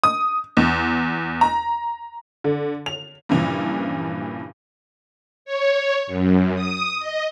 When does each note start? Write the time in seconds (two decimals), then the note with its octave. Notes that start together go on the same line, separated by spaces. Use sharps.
0.04 D#6
0.57 E2
1.41 A#5
2.44 D3
2.86 F7
3.29 G2 A#2 C#3 E3 F3
5.45 C#5
6.07 F#2
6.55 D#6
7.00 D#5